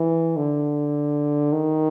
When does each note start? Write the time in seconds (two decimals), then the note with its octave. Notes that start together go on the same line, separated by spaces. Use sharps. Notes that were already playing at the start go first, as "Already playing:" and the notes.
Already playing: E3
0.36 D3
1.52 D#3